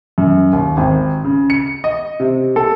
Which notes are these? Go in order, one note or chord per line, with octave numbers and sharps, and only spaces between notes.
F#2
D#2
G#1
C#3
C#7
D#5
C3
A4